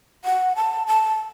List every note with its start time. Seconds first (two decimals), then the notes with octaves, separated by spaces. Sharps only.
0.25 F#5
0.56 A5
0.87 A5